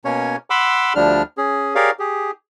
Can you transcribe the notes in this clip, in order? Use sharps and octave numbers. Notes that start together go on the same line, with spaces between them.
B2 A#3 C#4 C#5
F#5 B5 C6 D6 E6
D2 F3 G3 D4 F6
C#4 G#4
G4 G#4 A#4 C#5 D5 F5
G4 G#4